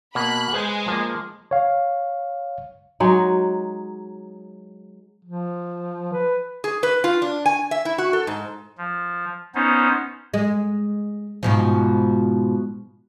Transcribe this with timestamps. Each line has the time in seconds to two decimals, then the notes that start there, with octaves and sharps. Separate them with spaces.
0.15 B2 A#3 B5 F#6
0.53 G#3 G#4 B4 C5
0.88 F3 A#3
1.51 C#5 F5
3.00 F#3 G#3 D#4
5.25 F3
6.13 B4
6.64 G#4
6.83 B4
7.04 F4
7.22 D4
7.46 G#5
7.71 E5
7.85 E4
7.98 F#4
8.13 A4
8.27 G#2
8.78 F3
9.55 B3 C#4 D#4 C5
10.34 G#3
11.43 G#2 B2 F3